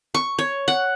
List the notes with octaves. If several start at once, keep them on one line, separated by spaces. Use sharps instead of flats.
C#6
C#5
F#5